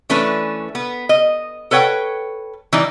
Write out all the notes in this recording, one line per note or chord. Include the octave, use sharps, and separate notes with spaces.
E3 A3 C#4 D4 B4
B3
D#5
A4 B4 C#5 F#5 G5
E3 G3 D#4 D5